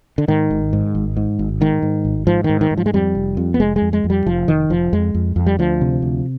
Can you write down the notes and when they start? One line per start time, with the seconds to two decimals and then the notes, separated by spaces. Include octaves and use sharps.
0.18 D3
0.28 G#2 D#3
0.51 G#1
0.73 G#2
0.95 G#1
1.17 G#2
1.39 G#1
1.61 G#2 D#3
1.82 G#2
2.05 G#1
2.27 G#2 F3
2.44 D#3
2.49 G#2
2.61 D#3
2.71 G#2
2.77 F3
2.86 G#3
2.94 F2 G3
3.15 F1
3.37 F2
3.54 B3
3.60 F1 G#3
3.76 G#3
3.82 F2
3.93 G#3
4.04 F2
4.10 G3
4.26 F1 F3
4.48 F1 D#3
4.70 F1 F3
4.93 F2 G#3
5.15 F2
5.36 F2
5.46 G3
5.59 D2 F3
5.81 C3
6.02 D2